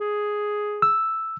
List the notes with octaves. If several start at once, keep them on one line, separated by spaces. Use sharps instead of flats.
G#4
E6